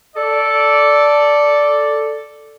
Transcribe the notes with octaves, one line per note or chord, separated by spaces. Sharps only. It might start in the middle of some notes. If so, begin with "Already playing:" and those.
A4 D5